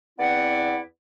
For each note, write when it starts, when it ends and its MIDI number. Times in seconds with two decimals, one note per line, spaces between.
0.19 0.80 40
0.19 0.80 59
0.19 0.80 60
0.19 0.80 64
0.19 0.80 74
0.19 0.80 78